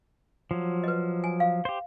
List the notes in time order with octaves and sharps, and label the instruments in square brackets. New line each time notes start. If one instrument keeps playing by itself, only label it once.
[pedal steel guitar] F3 F#3
[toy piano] B4 D#5
G#5
F5
[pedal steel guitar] G4 C5